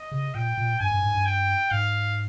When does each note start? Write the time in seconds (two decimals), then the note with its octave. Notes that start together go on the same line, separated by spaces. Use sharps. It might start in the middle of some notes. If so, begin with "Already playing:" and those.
Already playing: D#5
0.12 C#3
0.34 A#2 G5
0.57 A#2
0.80 G2 G#5
0.91 G2
1.03 G#2
1.15 G2
1.26 G5
1.71 G#2 F5